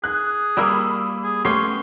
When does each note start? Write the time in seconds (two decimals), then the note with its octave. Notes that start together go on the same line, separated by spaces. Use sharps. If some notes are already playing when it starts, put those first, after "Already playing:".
0.04 G#4 F#6
0.57 G3 A#3 B5 D#6 E6
1.24 G#4
1.45 A3 B3 C#4 G4 C6 C#6 C7